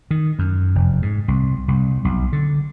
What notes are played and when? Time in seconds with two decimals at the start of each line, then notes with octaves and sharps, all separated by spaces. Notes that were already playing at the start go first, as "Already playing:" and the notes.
0.11 D#3
0.39 F#2
0.75 F1
1.02 G#2
1.28 C2
1.68 C2
2.05 B1
2.33 D3